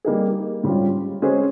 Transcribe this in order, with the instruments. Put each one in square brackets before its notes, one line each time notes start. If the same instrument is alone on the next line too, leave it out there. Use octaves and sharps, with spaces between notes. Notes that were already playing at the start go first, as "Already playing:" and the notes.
[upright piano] G3 A#3 D#4 G#4
G#2 G3 C#4 F4
G#3 C#4 G#4 C5